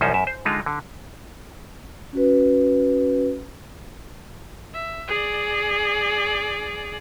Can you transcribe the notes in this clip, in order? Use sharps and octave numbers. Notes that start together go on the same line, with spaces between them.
C2 F#2 F3 C#4 D#4 C5
F#2 E5
C5
D3 G#3 D#4 F4
D3
C#4 F#4 B4
E5
G#4 D5